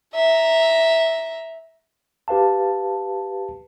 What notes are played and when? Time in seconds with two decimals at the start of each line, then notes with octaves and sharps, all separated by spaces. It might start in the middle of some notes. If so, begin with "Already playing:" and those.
0.15 E5 A#5
2.28 G4 B4 F5 A5